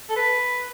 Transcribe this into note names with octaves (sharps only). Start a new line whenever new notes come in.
A4
B4